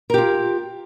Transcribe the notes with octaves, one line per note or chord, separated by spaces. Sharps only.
F4 G4 A#4